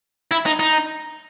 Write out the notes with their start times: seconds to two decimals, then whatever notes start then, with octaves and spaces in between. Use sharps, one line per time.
0.31 E4
0.46 D#4
0.59 D#4